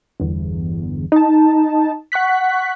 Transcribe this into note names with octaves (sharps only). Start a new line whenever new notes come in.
G1 E2
D#4 A5
F#5 C#6 F#6 B6